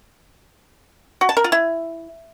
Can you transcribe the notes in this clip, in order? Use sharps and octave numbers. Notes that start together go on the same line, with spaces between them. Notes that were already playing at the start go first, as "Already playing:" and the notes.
F#4
A5
A#4
F4
E4